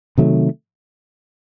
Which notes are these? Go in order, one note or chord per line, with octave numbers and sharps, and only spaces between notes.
C3 D#3 F#3 A3